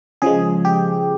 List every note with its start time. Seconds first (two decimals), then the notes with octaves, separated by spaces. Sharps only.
0.22 C#3 F3 G#3 G#4
0.65 G4